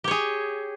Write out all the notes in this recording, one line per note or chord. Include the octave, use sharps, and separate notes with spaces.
G4 G#4 C#5